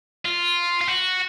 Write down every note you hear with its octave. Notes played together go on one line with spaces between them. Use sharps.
F4
F4
F#4